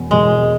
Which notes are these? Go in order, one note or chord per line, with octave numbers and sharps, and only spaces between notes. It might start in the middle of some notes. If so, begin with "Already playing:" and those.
Already playing: E1 E2 B2
E1 E2 B2 G#3